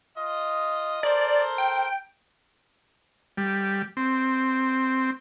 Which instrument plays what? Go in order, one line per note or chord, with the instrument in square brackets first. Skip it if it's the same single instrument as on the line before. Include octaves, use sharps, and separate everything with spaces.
[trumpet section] F4 D#5
[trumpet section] A4 A#4 C5 [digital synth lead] D5
[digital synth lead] G5
[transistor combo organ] G3
C4